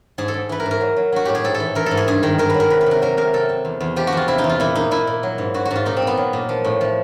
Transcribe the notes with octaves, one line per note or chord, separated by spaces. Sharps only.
G#2 G#4
A4
G#2
E3 B4
A#4
G#2
A#4
F#3
F#3
F#3 F#4
A2 G4
G#4
G#2 A4
A4
E3
E3 A#4
G#2 A4
G#4
G2 G#4
D#3 A#4
D#3 A#4
F#3 B4
A#4
C3 B4
B4
C3 A#4
F#3 A#4
C3 A#4
C3 A4
C3
E2
E2
F3 G4
F#4
E2 F4
C3 E4
D#4
E2
F4
A#2 E4
A#2 D#4
A#2 E4
A#2
F#3
G#2
G#2 F#4
F#4
G#2 F4
A#2 D#4
C4
A#2
B3
F#3
A#2
F3
A2
F3